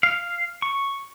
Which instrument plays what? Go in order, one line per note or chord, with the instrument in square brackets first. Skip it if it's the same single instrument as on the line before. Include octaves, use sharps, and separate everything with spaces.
[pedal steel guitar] F5
C#6